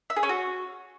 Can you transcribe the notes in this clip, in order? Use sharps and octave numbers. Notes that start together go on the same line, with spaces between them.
E5
G#4
C#4
F#4